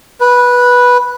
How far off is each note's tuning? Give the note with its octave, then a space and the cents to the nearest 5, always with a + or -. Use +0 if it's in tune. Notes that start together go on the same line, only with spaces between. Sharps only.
B4 -10